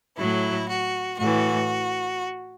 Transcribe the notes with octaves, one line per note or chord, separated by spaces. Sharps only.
A2 F#3 E4
F#4
A2 E3 F#4